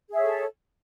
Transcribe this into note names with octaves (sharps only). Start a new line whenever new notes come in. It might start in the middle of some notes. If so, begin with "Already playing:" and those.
G#4 A4 C#5 E5